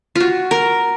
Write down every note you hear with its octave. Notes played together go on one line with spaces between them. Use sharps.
F4 F#4
A#4